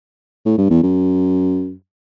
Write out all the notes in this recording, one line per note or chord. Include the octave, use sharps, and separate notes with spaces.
A2
G2
E2
F#2